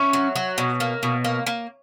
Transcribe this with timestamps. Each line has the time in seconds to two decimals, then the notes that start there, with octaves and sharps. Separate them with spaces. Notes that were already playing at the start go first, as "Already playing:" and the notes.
Already playing: C#4 C#5 E5
0.13 F#3
0.36 F#3
0.58 B2
0.80 A#3
1.03 B2
1.25 A#3
1.46 A#3